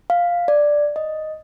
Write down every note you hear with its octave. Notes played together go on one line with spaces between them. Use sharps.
F5
D5
D#5